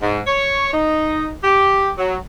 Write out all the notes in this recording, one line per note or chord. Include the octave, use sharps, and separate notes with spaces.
G#2
C#5
D#4
G4
F#3